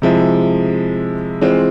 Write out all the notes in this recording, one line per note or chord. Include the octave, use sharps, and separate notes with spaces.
C3 F3 G#3 E4
E3 G#3 C4 F4